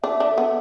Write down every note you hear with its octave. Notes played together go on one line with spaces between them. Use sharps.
D4 E5
D4
A4
B3